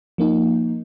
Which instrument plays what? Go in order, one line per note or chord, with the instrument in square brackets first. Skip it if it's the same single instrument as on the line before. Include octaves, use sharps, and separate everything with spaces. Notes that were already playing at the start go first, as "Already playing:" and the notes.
[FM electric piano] F3 A#3 D#4